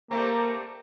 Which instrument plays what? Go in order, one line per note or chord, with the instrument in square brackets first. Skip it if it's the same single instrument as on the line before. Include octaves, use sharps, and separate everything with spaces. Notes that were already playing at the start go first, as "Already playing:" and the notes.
[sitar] G3 A3 C4 [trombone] A#3 [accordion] A#5 D6